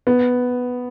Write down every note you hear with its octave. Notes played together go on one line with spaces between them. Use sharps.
B3